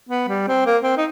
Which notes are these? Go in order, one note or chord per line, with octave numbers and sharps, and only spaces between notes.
B3
G3
C4
A#3
C4
D#4